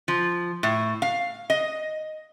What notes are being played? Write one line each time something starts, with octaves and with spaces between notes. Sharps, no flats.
F3
A2
F5
D#5